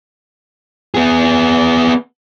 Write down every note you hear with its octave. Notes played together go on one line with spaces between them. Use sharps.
B3 G#4